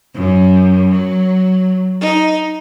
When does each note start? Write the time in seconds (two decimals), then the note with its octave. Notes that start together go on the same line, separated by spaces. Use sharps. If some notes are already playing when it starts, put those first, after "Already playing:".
0.15 F#2
0.90 F#3
2.02 D#4